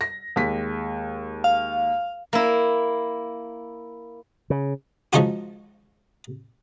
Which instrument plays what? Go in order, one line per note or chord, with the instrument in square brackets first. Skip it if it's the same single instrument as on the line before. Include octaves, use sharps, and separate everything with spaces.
[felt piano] A#6
D#2 G#3 B6
[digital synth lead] F5
[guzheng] A#3 E4
[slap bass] C#3
[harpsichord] F3 G#3 C#4 D#4 F4 F#4